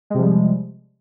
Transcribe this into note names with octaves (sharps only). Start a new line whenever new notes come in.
C3 F3 G3 G#3